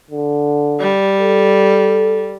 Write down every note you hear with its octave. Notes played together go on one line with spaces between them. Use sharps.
D3
G3
A4